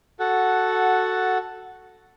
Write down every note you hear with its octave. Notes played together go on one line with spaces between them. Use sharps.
F#4 A4 F#5